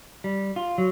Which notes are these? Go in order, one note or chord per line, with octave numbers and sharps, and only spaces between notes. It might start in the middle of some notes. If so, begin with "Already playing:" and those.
G3
F4
F#3